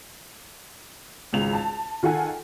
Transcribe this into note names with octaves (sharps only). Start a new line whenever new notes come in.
G#1 C#2 F7
A5
D#3 F4 A4 F#5 G#5